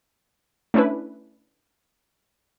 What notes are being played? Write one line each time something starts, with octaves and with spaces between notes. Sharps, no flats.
A3 C#4 D4 E4 B4